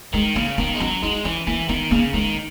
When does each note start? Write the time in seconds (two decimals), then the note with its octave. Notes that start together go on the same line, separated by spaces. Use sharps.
0.14 D#3 G#3
0.36 C#3 A#3
0.58 D#3 B3
0.75 G#3
0.80 F#3 C#4
1.02 G#3 D#4
1.25 E3 C#4
1.47 E3 A#3
1.69 D#3 B3
1.91 C#3 A#3
2.13 D#3 G#3